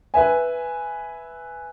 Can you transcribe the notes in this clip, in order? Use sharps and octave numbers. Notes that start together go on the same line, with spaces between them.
B4 E5 G#5